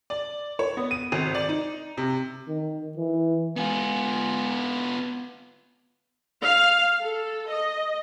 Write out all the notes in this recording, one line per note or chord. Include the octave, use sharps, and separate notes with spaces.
D5
C#5
B3
D#7
G#1
D5
D#4
C3
D#3
E3
G#3 B3 F4 G#5
F5
A4
D#5